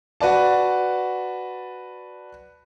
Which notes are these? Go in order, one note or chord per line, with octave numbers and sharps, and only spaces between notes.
F#4 B4 D5 A5